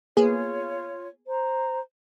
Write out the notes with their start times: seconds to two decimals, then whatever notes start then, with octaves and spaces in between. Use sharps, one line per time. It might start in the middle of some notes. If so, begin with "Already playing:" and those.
0.17 A#3 B3 F4 G#4 C#5
1.27 C5 A#5